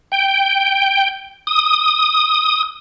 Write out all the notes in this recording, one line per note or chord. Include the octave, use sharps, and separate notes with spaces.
G5
D#6